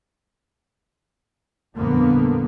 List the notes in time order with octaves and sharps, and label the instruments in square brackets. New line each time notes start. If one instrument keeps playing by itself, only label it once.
[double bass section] G1 F2 A#2 D3 A#3 B3